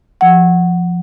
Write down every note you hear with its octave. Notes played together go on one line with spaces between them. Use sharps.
F3 F#5